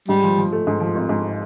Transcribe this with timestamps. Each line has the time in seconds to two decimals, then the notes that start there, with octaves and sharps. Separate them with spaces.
0.08 G#2 G3
0.23 F3
0.38 F3
0.53 A3
0.67 G#2
0.80 F3
0.95 G#1
1.09 G#2